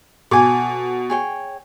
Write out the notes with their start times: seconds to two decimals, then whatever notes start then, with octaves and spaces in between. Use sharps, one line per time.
0.31 B2 A4 G#5 D6
1.10 G#4 C#5 G5